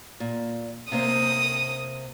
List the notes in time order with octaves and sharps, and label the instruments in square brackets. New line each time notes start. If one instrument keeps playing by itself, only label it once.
[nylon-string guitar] A#2
[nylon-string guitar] C3 A#3 C5 [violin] D#6